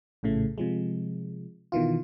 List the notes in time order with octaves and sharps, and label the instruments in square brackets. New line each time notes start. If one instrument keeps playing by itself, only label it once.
[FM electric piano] A#1 A2 C#3 A3
C3 F3 G#3
B2 D#3 E3 F4